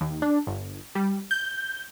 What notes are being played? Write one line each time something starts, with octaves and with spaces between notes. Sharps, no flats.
D#2
D4
G1
G3
G6